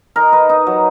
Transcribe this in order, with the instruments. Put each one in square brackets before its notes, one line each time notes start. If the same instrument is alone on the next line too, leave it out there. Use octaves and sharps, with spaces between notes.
[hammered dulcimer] D#4 A#4
D#4 B4
D#4
F#3